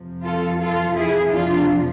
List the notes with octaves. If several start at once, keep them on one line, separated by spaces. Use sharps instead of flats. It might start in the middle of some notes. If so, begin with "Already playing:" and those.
Already playing: F2 C3 F3
F4 A4
F4 A4
E4 G#4
F2 C3 F3 D4 F4